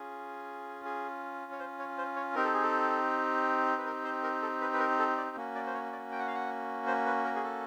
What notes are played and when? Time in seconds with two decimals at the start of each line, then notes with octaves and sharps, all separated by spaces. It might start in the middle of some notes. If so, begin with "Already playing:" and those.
Already playing: C#4 F4 G#4
0.85 G#4
1.52 C#5
1.59 C5
1.79 C#5
1.98 C5
2.16 C#5
2.35 C4 D#4 G4 A#4
2.44 A4
2.54 G#4
2.63 A4
3.78 B4
3.86 A#4
4.04 C5
4.23 A#4
4.42 A4
4.61 B4
4.74 B4
4.80 A#4
4.99 A4
5.17 D5
5.36 A#3 C#4 F#4
5.55 D5
5.67 C5
5.74 C#5
5.93 D5
6.12 G5
6.19 F#5
6.27 F5
6.35 F#5
6.87 C5
7.06 B4
7.25 A#4
7.36 G#4
7.44 A4